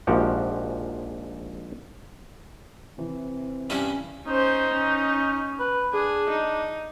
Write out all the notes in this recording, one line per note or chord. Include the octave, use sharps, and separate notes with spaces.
A#1 G#2 F3 F#4 G4 F#5
C3 E3 C4
G2 C#4 E4
C#4 D#4 C5
C#4
B4
D4 G#4
D#4